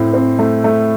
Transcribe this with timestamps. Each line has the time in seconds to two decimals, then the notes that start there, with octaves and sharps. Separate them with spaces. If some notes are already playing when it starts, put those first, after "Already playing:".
Already playing: A2 C4
0.14 C4
0.39 A3
0.64 A3